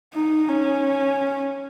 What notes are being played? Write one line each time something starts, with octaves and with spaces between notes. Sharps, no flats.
D#4
C#4